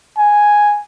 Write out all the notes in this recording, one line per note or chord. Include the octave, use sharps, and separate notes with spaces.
G#5